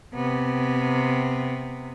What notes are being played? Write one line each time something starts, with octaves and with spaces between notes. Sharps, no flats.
C3 B3